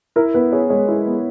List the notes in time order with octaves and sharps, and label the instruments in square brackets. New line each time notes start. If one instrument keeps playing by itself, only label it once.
[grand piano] E4 [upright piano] A#4
[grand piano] B3 [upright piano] B4
[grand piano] G#4 [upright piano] C#5
[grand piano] G#3 [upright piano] C#5
[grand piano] E4
B3